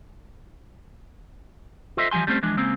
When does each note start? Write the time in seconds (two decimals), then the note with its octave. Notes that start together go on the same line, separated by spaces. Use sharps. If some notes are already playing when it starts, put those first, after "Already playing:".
1.97 F4 A4 C5 D#5 E5
2.11 E3 F3 G3 G#5 C6
2.27 G3 A3 C4 C#4 C5
2.43 E3 F3 G#3 D4
2.57 C#3 G#3 A#3 C4